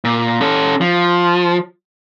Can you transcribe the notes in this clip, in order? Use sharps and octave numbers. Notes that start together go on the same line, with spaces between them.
A#2
C#4 A4
F3